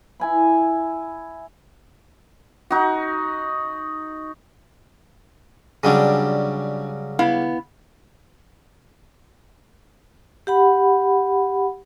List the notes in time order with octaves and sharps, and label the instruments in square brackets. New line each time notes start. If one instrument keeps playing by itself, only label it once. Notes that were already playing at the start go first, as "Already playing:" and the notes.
[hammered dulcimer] E4 G#5 B5
D#4 F#4
[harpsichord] C#3 F#3 G3 [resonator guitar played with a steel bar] D4 G#5
[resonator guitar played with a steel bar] B3 E4 F5
[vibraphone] G4 F#5 B5